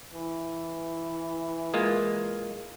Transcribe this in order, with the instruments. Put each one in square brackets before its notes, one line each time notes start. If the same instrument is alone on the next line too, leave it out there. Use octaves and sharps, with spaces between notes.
[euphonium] E3
[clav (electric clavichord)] G#3 A#3 F4